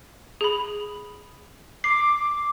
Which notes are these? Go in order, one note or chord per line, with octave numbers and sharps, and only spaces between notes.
G#4 B5
D6 C7